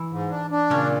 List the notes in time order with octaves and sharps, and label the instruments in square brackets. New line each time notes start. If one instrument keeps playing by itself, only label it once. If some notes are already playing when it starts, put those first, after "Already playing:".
Already playing: [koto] E3 E4
[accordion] G#2
D4
D4
[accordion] A#2 [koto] C#3 C#4